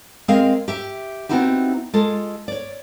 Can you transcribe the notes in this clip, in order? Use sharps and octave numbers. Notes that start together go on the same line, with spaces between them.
G#3 C4 G#4 A#4 D#5 F5
G4 E5 G5
B3 C4 D#4 E4 F#4 G4
G#3 F4 A4
C#5 D5